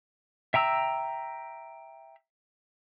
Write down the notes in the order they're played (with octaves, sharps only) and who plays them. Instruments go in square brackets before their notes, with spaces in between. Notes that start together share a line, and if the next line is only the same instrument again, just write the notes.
[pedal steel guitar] E5 G5 A#5 E6